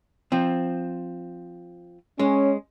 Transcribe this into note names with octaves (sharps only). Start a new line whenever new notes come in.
F3 C4
G#3 C#4